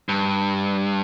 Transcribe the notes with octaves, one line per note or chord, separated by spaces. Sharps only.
G2